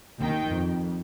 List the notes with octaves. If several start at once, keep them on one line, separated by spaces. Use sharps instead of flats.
D#2 D#3 G5
F2